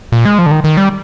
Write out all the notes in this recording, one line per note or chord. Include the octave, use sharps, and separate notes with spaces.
A#2
G#3
F3
D3
D#3
D#3
G3